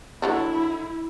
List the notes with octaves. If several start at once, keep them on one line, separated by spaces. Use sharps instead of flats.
D3 F#3 D4 E4